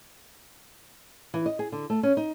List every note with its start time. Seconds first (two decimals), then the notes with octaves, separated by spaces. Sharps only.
1.34 E3
1.46 D#5
1.59 G#4
1.72 D3
1.90 A3
2.03 C#4
2.17 D#4